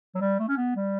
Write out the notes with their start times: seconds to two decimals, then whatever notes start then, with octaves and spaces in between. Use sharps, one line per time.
0.15 F#3
0.21 G3
0.39 A3
0.48 C#4
0.57 B3
0.76 G3